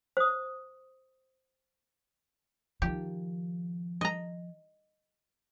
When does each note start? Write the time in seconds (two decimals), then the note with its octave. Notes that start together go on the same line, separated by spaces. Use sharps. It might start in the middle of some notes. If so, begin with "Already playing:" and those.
0.17 C5 D#6
2.82 D#3 F3 G4
4.01 D#5 A#5